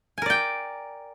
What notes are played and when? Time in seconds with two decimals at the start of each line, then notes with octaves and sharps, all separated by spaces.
0.18 G#5
0.22 A#4
0.26 D5
0.30 G5